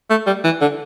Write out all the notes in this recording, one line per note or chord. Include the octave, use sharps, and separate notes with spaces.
A3
G3
E3
D3